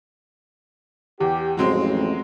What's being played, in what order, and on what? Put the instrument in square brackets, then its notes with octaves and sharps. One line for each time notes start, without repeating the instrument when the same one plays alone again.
[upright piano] E2 [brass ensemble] G4
[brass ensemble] A1 F2 [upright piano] F#3 G#3 C4